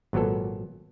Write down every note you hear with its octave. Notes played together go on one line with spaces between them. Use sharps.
G#1 A#2 F#3 B3 A4